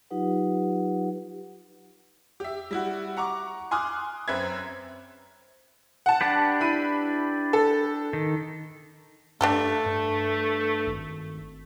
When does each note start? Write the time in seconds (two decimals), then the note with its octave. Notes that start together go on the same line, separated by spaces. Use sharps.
0.10 F#3 D#4 F4 G4 B4 F#5
2.40 G4 E5
2.71 G3 E4 F#4
3.17 F#5 A#5 C#6 D6
3.71 G#5 C6 D6 D#6 F6 F#6
4.28 F#2 C4 B4 E5 G#6
6.06 F#5 A5
6.21 D4 G4 B4
6.60 E4 B5 D#7
7.53 A4
8.13 D#3
9.41 G2 A3 D4 G4 A4
9.86 G2
10.87 G#1